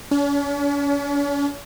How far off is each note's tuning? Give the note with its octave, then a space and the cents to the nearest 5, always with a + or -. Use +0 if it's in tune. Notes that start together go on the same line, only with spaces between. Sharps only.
C#4 +45